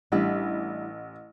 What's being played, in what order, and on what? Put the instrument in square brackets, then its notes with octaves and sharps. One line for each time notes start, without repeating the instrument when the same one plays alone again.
[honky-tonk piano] A1 [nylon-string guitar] G3 D4 E4